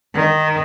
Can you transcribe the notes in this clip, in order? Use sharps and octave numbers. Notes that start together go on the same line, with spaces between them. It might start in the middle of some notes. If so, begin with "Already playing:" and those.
D#3